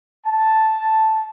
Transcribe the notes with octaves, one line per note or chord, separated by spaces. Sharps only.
A5